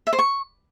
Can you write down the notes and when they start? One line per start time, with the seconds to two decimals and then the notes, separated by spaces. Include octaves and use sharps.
0.07 E5
0.13 C5
0.19 C#6